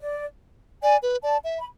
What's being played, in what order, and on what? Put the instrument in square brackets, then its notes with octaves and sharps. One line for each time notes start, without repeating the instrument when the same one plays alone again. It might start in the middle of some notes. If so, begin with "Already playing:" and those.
[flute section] D5
[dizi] D5 [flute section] G#5
[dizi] B4
[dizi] D5 [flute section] A5
[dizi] E5
[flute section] B5